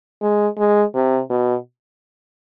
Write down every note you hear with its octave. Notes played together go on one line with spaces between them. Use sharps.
G#3
G#3
C3
B2